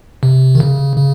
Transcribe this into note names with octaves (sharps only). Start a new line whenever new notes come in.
C3
D#3
C#3
C#3